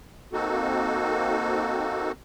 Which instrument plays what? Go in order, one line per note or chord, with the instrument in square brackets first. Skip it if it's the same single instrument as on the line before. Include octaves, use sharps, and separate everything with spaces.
[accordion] A#3 C4 D#4 F#4 A4